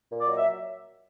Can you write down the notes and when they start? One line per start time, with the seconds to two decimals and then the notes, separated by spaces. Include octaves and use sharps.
0.10 A#2
0.20 D5
0.28 F#3 D#5
0.38 E5